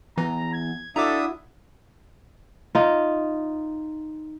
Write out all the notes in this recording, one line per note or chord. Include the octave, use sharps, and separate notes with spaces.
E2 E3 A#5
G#6
D4 E4 F#4 A4 E5 A#5 D6 D#6
D#4 F4